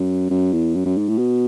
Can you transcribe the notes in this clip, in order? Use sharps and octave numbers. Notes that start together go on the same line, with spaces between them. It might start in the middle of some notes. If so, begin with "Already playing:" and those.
Already playing: F#2
F#2
E2
F#2
F#2
G#2
A2
B2